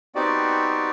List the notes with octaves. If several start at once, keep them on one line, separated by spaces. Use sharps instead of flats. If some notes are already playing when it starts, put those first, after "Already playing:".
B3 C4 D#4 F#4 G4 D5